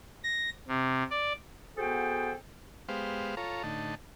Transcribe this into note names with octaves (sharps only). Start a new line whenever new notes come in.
A#6
C3
D5
B3 F#4 G#4 A4 C5 G5
G#3 B3 G4 C5 F5
F4 A4 C#5 A#5
A2 D3 D#4 A5